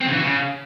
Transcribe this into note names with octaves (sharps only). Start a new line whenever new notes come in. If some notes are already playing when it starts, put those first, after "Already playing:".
C4
C#3
E3
F#4
C#3